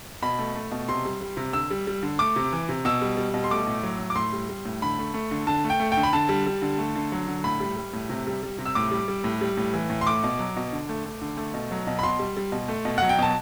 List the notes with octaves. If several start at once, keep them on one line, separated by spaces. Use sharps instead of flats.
B2 B5
A3
A3
B2
C3 C6
G3
G3
C3
D3 E6
G3
G3
D3
A3 D6
C3
E3
C3
B2 E6
G3
G3
B2
C6
A3 D6
A2
F#3
A2
D6
A2 C6
G3
G3
A2
D3 B5
A3
A3
D3
D3 A5
A3
G5
A3
G5
D3
B5
D3 A5
G3
G3
D3
A3
D3
F#3
D3
A2 B5
G3
G3
A2
C3
G3
G3
C3
E6
A2 D6
G3
G3
A2
G3
A2
E3
A2
C6
A3 D6
B2
F#3
B2
D3
A3
A3
D3
A3
B2
F#3
B2
B5
B2 C6
G3
G3
B2
A3
B2
F#3 F#5
G5
B2 A5